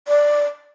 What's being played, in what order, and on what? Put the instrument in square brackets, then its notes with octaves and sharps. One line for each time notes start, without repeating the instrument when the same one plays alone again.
[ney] D5